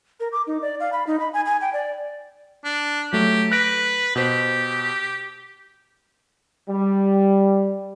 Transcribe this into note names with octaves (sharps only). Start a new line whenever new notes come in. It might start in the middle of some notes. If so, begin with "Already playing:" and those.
A#4
D6
D#4
D5
F5
B5
D#4
B5
G#5
G#5
G5
D5
D4
F#3 A3 G4
B4 F#6 A#6 D7
B2 G4 C5
G3